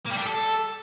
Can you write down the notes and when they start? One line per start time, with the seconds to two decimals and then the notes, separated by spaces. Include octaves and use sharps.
0.06 A#3
0.11 G3
0.16 D4
0.21 G4
0.27 A4